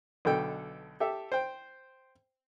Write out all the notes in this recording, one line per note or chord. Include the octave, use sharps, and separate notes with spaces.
B1 B2 D3 A4 G5
G4 A4 E5
C5 G5